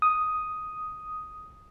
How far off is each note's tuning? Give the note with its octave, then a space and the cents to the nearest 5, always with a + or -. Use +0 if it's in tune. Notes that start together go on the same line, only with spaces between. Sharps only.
D#6 +5